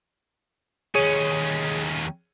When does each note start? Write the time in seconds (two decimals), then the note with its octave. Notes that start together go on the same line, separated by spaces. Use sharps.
0.95 D#2 C#4 G#4 C#5 D#7